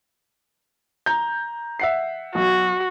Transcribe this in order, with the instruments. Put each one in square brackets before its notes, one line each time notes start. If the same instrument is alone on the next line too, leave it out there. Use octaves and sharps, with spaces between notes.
[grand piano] A#5 G6
E5 F#5 C7
[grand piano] B1 [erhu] F#4